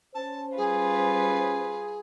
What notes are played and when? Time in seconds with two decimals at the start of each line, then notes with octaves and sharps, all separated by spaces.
0.15 C#4 C5 A5
0.57 G3 F4 G#4 B4